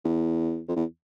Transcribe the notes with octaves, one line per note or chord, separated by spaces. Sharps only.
E2
F2
E2